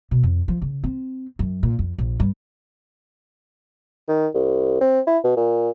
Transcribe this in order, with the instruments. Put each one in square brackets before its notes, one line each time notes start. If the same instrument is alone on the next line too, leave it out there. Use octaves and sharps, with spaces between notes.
[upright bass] B2
F2
F3
C#3
C4
F#2
A#2
F2
A#1
G2
[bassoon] D#3
C2
C4
E4
B2
A#2